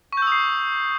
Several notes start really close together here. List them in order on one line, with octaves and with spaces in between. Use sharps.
C#6 G6 E6 D#6 C7